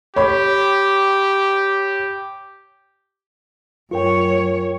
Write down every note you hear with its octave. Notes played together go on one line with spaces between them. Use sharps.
G4 C#5 B5
F#2 F4 A#4 C#5 G5